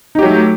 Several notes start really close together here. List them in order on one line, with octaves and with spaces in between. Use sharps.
D#4 G4 F#3 A3